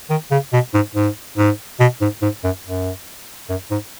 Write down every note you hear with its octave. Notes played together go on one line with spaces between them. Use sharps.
D#3
C#3
B2
G#2
G#2
G#2
B2
G#2
G#2
F#2
F#2
F#2
G#2